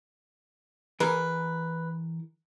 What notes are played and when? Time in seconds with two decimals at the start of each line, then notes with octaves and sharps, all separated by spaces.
1.00 E3 G#4 A#4 B4